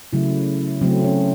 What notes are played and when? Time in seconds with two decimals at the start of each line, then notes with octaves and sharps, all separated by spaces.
0.13 C#3 F#3 A3 E4
0.81 C#3 F#3 A3 C4
1.04 C#4